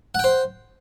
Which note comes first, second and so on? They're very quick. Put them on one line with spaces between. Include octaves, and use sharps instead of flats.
F#5 G5 C5